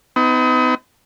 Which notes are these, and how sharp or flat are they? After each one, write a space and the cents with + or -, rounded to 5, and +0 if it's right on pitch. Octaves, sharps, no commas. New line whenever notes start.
B3 +40 D#4 +35